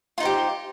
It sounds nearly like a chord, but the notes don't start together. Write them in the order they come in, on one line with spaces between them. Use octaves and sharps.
F4 D#4 C5 G4